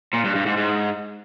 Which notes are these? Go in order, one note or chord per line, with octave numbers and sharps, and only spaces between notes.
A#2
G2
G2
G#2
G#2